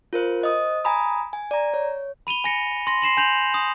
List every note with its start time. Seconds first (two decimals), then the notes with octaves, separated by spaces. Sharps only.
0.13 F4 A#4 C5
0.41 C5 D#5 D#6
0.84 G#5 A#5 B5 D#6
1.33 G#5
1.51 D5 A#5
1.74 C#5
2.27 B5 D#7 F7 G7
2.44 G#5 A#6 C#7
2.87 C6 A#6
3.02 C6 C7 E7 F#7
3.17 G#5 G6 F7 F#7
3.54 D#6